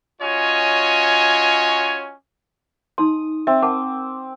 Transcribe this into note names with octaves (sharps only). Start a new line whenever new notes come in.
C#4 F4 F#4 C#5 D#5 G#5
D#4 C6 D#6
C4 E5
A#4 F#5 A5 D6